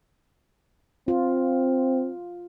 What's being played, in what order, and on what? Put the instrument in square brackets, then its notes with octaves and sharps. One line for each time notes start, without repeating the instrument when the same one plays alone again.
[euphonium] C4 [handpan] F4